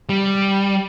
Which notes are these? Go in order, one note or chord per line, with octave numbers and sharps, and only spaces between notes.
G3